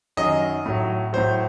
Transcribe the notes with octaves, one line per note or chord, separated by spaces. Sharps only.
F#2 D#3 F#3 D#5
A2 F#3
A2 F#3 C5